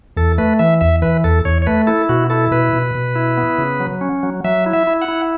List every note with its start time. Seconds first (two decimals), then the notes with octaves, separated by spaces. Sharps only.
0.17 E2 A4
0.38 A3 B4
0.59 E3 E5
0.81 E2 E5
1.02 E3 B4
1.24 E2 A4
1.45 E2 C#5
1.62 C#5
1.67 A3 B4
1.87 E4 A4
2.09 B2 F#4
2.30 E4 A4
2.51 B2 B4
2.73 B2
2.95 B2
3.15 E4
3.37 B3
3.58 C#3
3.80 F#3
4.01 C#4
4.23 F#3
4.44 F#3 E5
4.66 E4
4.73 E5
4.87 E4
5.02 F#5
5.08 E4